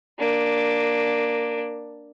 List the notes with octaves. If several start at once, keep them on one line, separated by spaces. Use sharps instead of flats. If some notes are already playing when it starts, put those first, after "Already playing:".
A#3 D4